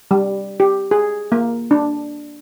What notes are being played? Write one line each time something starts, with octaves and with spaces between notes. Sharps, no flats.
G3
G4
G#4
A#3
D4